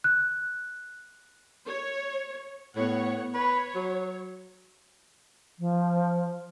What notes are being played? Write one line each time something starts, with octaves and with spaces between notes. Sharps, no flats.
F#6
C#5
A2 B3 C#5 F#5
B4 C#5
F#3
F3